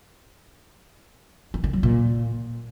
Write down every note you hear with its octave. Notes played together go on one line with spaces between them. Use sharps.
D#3
D3
F#3
A#2